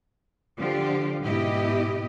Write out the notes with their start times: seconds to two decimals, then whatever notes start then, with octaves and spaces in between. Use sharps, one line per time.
0.59 D3 F3 F4 G4
1.24 G#2 B2 E4 G4 D#5